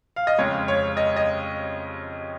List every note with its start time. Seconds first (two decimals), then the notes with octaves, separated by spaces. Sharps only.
0.16 F5
0.27 D#5
0.38 F2 C#3 G#3 C#5
0.68 C#5
0.97 D#5
1.17 D#5